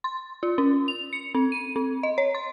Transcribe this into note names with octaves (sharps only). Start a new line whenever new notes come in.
C6
F4
C#4
F7
C#7
C4
D#7
C4
D#5
C#5
C6